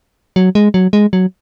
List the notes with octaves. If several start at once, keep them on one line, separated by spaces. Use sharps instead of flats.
F#3
G#3
F#3
G#3
F#3